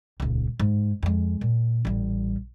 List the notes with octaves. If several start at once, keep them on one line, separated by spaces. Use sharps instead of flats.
D#1 C#2
G#2
F2 G#3
A#2
A1 G3